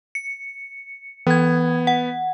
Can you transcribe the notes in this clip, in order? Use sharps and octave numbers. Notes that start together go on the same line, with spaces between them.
C#7
E3 B3 G#6
F#5